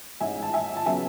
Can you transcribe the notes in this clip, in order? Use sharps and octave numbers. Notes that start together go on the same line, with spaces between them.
A1 G#2 G#3 E5 G#5
A5
E5 G#5
A5
C#3 F#3 B3 E5 G#5